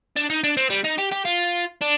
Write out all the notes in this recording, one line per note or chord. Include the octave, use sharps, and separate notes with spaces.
D4
D#4
D4
C4
G3
D#4
G4
G4
F4
D4